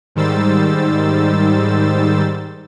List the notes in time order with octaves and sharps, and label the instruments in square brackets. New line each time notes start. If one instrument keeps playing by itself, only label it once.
[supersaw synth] G#2 D#3 G3 C5 E6 A6